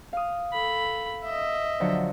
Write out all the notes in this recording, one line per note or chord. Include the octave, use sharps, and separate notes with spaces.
F5 D#6
A4 B5
D#5 E5
D3 F3 F#3